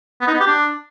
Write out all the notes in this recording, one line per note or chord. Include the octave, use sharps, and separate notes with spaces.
B3
D#4
B3
G4
D4